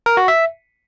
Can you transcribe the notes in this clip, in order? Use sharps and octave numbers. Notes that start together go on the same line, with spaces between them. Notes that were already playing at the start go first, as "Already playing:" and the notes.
A#4
F#4
E5